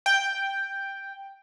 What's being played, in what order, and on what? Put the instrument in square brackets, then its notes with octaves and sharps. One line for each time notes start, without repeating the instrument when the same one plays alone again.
[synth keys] G5